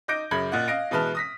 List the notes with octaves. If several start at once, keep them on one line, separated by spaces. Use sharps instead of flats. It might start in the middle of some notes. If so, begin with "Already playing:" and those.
D#4 D6 G6 A#6 D7
F#2 C#3 B5 G#6
A#2 D#5 F#5 F#6
D#5 F5 A#6 D7
B2 E3 G#3 B4 A5 F6
D#6 A#6 B6